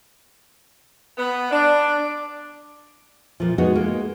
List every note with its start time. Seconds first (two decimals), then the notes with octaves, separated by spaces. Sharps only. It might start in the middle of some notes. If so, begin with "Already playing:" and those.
1.17 B3
1.51 D4
3.40 A#2 F3
3.58 G#3 B3 D#4 F#4
3.75 G#3 A#3